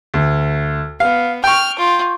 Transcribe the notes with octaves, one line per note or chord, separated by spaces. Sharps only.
D2
B3 F5
G5 C#6 F6
F4